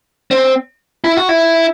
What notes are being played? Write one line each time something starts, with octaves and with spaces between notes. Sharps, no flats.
C4
E4
F#4
E4